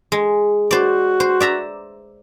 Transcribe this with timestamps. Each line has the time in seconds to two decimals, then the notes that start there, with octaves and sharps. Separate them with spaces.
0.12 G#3
0.71 F#4 C5 D5
1.20 C5
1.40 D5 E5 A#5